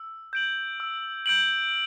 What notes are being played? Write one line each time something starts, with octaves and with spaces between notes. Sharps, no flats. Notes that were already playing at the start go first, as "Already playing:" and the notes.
Already playing: E6
G6 D7 F#7
E6
G6 D7 F#7